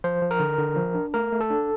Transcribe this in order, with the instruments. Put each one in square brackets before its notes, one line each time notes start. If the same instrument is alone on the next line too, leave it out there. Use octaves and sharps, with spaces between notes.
[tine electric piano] F3 C5
F3
A#4
D3
D3
F3
D4
A3 A#4
A3
A4
D4